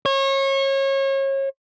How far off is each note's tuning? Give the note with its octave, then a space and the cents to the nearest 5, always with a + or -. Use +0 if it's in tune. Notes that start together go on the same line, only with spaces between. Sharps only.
C#5 -30